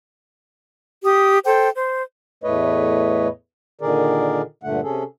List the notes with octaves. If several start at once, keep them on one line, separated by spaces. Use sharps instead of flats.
G4 D#6
A4 C5 G5
C5
E2 A2 A3 B4 C#5 D#5
A#2 D3 D#3 G#4 A#4 D5
G2 A#2 D3 A3 F#5
C3 C#4 G#4 A4